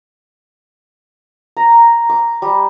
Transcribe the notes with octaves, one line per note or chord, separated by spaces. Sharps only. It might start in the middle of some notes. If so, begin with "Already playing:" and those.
A#5
D6
G3